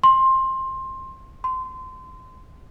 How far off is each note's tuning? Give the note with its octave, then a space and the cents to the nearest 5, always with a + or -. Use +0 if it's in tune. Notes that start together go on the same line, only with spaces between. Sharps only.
C6 +15
C6 -25